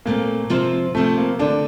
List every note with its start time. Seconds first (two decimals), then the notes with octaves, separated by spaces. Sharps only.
0.06 A#2 A3 A#3 C4
0.50 C3 F3 C4 F4 C5
0.95 C3 F3 A3 C4
1.18 A#3
1.39 D3 A3 C4 D4